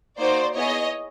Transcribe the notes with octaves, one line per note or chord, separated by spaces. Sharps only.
A#3 D#4 F#4 C5 D5
B3 E4 G#4 C#5 D#5